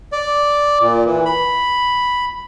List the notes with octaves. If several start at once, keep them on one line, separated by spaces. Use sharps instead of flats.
D5
A#2
E3
B5